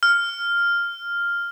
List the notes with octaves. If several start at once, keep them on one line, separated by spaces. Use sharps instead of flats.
F6